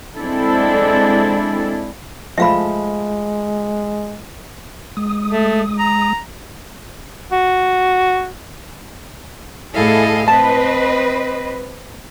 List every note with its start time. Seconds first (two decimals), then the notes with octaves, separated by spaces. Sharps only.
0.18 G#3 C4 D4 E4 A4
2.38 F3 G#3 A3 E5 F5 B5
4.97 G#3 D#6
5.32 A3
5.79 A#5
7.32 F#4
9.74 A2 E4 G#4 A4 D#5 F5
10.28 C4 B4 D#5 A5